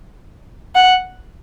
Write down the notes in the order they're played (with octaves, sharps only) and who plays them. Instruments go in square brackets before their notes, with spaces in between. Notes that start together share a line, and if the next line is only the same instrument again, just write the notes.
[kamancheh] F#5